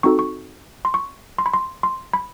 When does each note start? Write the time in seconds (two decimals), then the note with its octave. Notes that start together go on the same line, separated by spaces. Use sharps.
0.03 C4 D#4 F#4 A4 C#6
0.19 C#6
0.85 C6
0.94 C#6
1.38 C6
1.46 B5
1.53 C6
1.83 C6
2.13 B5